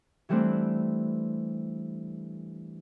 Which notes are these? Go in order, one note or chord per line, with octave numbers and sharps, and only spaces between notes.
E3 G3 A3 C4 D4